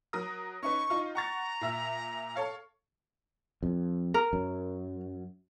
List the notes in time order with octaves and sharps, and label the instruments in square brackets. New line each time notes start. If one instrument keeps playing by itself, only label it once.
[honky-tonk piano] F#3 A#4 D#6
[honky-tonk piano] C#4 D#4 B4 [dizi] C#6
[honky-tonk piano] D#4 F4
[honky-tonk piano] F#5 C#6 A6 [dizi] A#5
[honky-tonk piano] A#2 E5 E6
A4 C#5 F5
[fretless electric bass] F2
[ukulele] A#4
[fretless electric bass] F#2